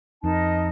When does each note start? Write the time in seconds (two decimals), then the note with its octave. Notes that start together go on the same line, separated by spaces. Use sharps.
0.24 F2 D#4 A#4 D#5 A5